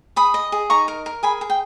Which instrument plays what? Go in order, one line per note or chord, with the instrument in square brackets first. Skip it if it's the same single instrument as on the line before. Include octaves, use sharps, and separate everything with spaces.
[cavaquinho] G#4 B5 D#6
D#5
G#4
D#4 A#5 C#6
A#4
A#4
G#4 G#5 B5
G#4
G5